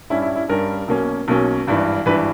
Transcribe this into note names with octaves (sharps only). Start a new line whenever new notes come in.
G2 G3 C#4 E4
E4
E4
G2 G3 C#4 A#4
B1 B2 A#3 C#4
B1 B2 A#3 C#4
G#1 G2 E3
G#1 G2 E3 B4